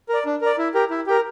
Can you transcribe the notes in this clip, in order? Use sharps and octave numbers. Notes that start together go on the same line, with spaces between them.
A#4 D5
D4
A#4 D5
E4
G4 A#4
E4
G4 A#4